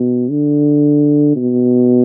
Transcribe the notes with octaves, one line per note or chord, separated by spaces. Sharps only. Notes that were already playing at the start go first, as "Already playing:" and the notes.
Already playing: B2
D3
B2